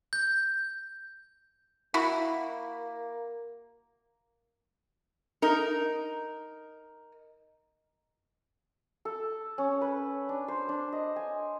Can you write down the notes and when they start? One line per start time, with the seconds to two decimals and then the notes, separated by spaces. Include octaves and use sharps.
0.13 G6
1.94 A#3 E4 F#4
5.42 D#4 A#4
9.05 A4
9.58 C#4
9.81 B4
10.29 D4
10.48 C5
10.69 D4
10.92 D#5
11.16 G#5